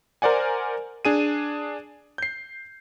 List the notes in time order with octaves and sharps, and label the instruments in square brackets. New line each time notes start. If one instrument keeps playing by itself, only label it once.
[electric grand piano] A#4 C5 D5 F#5 G#5
D4 G#4 D#7
G6 C7